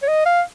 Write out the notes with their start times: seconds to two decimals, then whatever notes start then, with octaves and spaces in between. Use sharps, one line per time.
0.02 C#5
0.08 D#5
0.26 F5